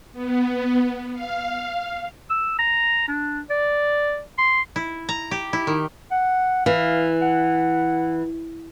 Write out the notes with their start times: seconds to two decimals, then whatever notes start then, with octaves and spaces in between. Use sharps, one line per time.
0.13 B3
1.13 F5
2.30 E6
2.59 A#5
3.08 D4
3.50 D5
4.38 C6
4.76 E4
5.09 A#5
5.31 G4
5.53 E4
5.67 D#3
6.11 F#5
6.66 E3 F5
7.22 F#5